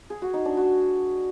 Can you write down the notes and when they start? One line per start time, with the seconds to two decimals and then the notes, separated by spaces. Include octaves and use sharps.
0.10 G#4
0.22 F#4
0.34 D#4
0.45 D4
0.57 F#4